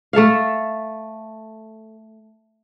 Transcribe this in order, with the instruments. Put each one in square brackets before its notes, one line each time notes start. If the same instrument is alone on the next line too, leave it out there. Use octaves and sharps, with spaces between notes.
[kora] A3 A4 E5 F5